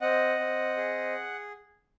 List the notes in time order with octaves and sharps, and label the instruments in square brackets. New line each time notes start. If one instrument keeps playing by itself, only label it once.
[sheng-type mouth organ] C4 D#5 F#5
C4
G#4